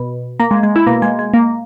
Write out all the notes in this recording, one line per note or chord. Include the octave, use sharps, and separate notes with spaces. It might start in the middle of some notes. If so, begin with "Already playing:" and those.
Already playing: B2
A#3
G#3
G#3
E4
B2 A#3
G#3
G#3
A#3